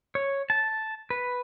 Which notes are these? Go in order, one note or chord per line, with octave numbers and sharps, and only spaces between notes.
C#5
A5
B4